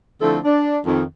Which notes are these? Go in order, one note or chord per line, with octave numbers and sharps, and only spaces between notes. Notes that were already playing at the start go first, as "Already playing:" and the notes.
D3 F3 A3 C4 E4 A4
D4
F2 D#3